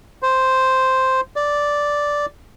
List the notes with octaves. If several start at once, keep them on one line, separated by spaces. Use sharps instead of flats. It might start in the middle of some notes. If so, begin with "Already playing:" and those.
C5
D5